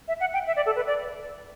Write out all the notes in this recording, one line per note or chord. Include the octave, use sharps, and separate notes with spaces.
E5
F#5
G5
E5
D5
A4
B4
D5